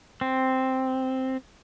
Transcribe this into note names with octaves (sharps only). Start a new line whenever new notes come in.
C4